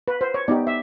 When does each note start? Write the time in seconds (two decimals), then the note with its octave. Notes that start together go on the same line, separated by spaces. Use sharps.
0.08 B4
0.21 C5
0.34 C#5
0.48 B3 D#4 G4 D5
0.67 E5